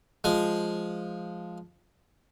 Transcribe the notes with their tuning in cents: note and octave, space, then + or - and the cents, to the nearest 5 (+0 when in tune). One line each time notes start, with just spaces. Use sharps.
F3 +0 G#3 +0